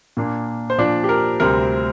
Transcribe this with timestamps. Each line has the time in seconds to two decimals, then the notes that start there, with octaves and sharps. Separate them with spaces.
0.17 A#2 A#3 D4
0.70 C5
0.78 A#2 F3 D4 D5
1.04 G4
1.09 A#4
1.40 D2 C3 G3 C4 A#4